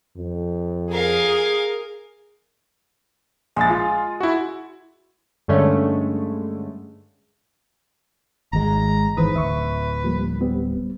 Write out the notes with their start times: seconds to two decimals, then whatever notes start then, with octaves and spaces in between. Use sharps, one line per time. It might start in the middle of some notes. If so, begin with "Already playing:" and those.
0.17 F2
0.92 G#4 A#4 F5
3.56 A#1 G#3 A6
3.70 F4
4.20 E4 F#4
5.48 G2 D3 G#3 A3 C#4
8.53 G#1 G#3 A#5
9.17 G#1 G#2 E3 B4 C5 D#6
9.35 D1 E5 C#6
10.04 F3 G3 A#3
10.41 G3 B3 C4